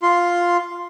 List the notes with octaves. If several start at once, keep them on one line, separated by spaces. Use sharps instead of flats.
F4 C6